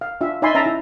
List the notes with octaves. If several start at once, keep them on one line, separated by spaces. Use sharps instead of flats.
F5
D4 F4 E5
D#4 D5 E5 G#5 B5 C6
C#4 E5 A5 A#5
E4